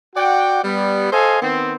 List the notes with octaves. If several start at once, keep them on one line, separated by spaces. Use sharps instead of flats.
F#4 D5 F#5 G5
G3 B3
A4 C5 D#5 F5 G#5
D#3 B3 C4